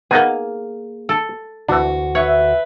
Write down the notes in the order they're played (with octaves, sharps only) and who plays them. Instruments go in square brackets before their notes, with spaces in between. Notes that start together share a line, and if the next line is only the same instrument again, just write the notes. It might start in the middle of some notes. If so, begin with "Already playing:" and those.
[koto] A#3 G#4 [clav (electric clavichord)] B3 D#4 F#5
[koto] A4
[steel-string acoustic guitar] D2 F#4 [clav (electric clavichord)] E3 D4
[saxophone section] B4 E5 [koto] C#5